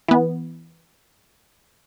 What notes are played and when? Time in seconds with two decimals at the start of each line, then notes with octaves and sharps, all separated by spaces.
0.08 E3 B3